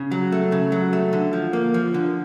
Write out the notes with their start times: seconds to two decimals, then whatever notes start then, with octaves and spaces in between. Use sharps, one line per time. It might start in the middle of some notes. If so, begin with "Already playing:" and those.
Already playing: C#3
0.11 F#3
0.32 A3
0.52 C#3
0.72 F#3
0.93 A3
1.13 D3
1.33 F3
1.53 A#3
1.74 F3
1.94 D3